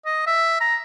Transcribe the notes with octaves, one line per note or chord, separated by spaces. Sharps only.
D#5
E5
A#5